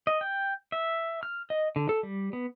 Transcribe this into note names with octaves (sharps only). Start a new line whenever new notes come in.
D#5
G5
E5
F6
D#5
D3
A4
G3
B3